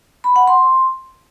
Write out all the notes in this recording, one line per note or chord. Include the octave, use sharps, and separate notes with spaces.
B5
F#5
C6